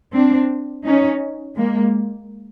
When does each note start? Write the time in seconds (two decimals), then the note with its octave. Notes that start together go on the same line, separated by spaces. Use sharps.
0.13 C4 D4
0.85 C#4 D#4
1.56 G#3 A#3